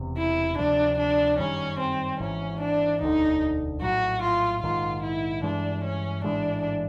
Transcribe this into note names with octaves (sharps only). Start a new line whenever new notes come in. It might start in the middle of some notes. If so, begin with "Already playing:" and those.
Already playing: E1 E2 C3
E4
D2 C3 F3 D4
D4
G1 F#2 D#3 G3 C#4
C4
G#1 G#2 E3 C#4
D4
E1 D2 D3 D#4
A#1 A2 F#3 F#4
F4
A#1 G#2 D#3 F4
E4
G2 E3 G#3 D4
C#4
A1 G#2 E3 G#3 D4